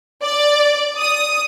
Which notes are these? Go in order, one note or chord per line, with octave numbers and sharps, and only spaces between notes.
D5
D#6